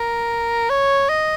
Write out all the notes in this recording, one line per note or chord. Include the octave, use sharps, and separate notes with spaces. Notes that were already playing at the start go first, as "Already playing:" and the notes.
Already playing: A#4
C#5
D#5